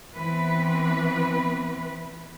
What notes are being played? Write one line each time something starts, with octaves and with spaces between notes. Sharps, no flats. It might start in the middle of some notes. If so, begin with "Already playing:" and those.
E3 B3 C4 B4